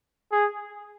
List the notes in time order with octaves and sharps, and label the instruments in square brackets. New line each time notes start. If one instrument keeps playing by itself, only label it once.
[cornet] G#4